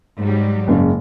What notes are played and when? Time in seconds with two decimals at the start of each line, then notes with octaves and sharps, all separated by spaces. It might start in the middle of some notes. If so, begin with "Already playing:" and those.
0.19 G#2 F#3 G3
0.68 F#1 C#3